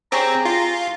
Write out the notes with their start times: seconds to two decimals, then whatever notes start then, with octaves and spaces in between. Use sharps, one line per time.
0.12 C4 G4 G#4 C#5 A#5
0.45 F4